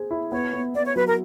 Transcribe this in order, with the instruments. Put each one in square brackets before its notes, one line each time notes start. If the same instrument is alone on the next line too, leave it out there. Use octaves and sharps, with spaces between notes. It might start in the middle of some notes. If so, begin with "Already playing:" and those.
Already playing: [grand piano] G#4 C5
E4
[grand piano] B3 [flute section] C#5
[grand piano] B3
[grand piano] B3 [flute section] D5
[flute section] C#5
[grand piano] F#3 [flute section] B4
[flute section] A#4